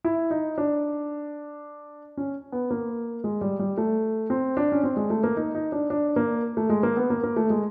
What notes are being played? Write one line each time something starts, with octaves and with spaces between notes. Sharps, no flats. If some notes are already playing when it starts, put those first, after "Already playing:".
E4
D#4
D4
C#4
B3
A#3
G#3
G3
G3
A3
C4
D4
C#4
C4
G#3
A3
A#3
D#4
D#4
D4
D4
A#3
A3
G#3
A#3
B3
A#3
A#3
A3
G#3